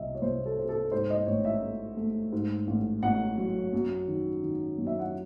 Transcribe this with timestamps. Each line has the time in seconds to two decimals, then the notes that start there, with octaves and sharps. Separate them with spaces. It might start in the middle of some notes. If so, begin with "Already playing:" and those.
Already playing: C2 D#5 E5
0.15 C#5
0.22 C2 C5
0.46 A4
0.57 C3 C5
0.69 A4
0.92 G#2 C5
1.10 D#5
1.27 A1 C#5
1.45 E5
1.62 A3
1.97 A3
2.32 G#2
2.67 A1
3.03 A1 F#5
3.38 F#3
3.73 F#2
4.08 D#3
4.43 D#3
4.78 F#2
4.87 E5
4.99 F#5